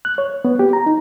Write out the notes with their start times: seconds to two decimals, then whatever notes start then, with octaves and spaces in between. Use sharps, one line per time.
0.05 F#6
0.18 C#5
0.45 B3
0.59 G4
0.73 A#5
0.86 D#4